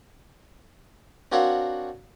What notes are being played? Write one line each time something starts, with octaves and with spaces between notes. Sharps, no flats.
C4 D4 F#4 A#4 C#5 F5